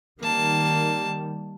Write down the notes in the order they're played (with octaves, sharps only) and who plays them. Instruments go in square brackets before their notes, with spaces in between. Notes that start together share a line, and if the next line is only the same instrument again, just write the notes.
[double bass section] D#3 G3 [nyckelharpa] A#3 A5